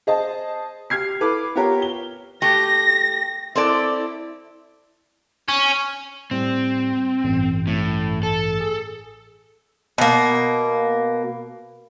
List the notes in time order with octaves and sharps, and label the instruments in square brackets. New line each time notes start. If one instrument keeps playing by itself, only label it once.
[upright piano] G#4 C5 D#5 A5
G4 F6 G#6 C7
E4 A4 B4 D6
B3 F4 G4 A#4 C#5
G7
[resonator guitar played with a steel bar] A3 G4 [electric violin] A#6
[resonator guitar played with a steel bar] C4 A4 D5 [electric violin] E4
[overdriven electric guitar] C#4
[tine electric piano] A2 G3 [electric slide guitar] C4
[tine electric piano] A1 G2
[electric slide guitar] A2
A4
[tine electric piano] G#4
[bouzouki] B2 A#3